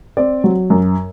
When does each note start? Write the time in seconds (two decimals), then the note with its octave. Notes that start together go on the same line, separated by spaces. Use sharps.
0.17 C4 D5
0.44 F#3
0.70 F#2